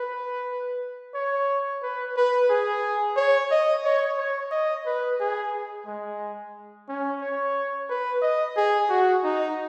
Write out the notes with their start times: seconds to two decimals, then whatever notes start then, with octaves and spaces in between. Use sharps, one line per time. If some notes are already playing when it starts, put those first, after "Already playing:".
Already playing: B4
1.14 C#5
1.83 B4
2.16 B4
2.50 G#4
3.16 C#5
3.51 D#5
3.85 C#5
4.18 C#5
4.51 D#5
4.86 B4
5.20 G#4
5.86 G#3
6.88 C#4
7.21 C#5
7.89 B4
8.22 D#5
8.56 G#4
8.89 F#4
9.24 D#4